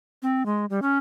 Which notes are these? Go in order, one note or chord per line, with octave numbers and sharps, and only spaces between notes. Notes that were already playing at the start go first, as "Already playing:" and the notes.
C4
G#3
G3
C#4